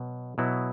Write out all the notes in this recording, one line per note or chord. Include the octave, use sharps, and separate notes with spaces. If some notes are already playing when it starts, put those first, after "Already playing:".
Already playing: B2 F#3
B2 F#3 B3 E4